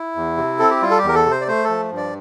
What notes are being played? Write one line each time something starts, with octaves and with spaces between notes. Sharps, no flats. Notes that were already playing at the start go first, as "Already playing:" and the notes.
Already playing: E4
E2
C3
C4 A4
G4
G3 F4
A4
G4
E2
A#4
A4
C3
C5
D5
A3 C5
A4
F3
G2
D5